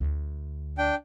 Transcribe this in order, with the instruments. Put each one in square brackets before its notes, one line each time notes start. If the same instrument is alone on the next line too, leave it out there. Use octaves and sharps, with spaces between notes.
[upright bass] D2
[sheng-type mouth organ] D4 G5